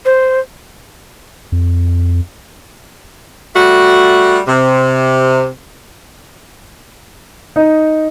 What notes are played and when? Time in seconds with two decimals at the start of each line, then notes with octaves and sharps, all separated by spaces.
0.05 C5
1.52 F2
3.56 G3 A3 F#4
4.48 C3
7.56 D#4